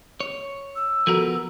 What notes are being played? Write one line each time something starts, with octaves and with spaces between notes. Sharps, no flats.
C#5
E6
F3 B3 F#4 A4 A#4